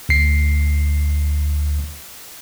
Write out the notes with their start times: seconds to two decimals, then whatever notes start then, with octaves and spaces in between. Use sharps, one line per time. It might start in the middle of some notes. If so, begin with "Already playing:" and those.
0.09 D2 C7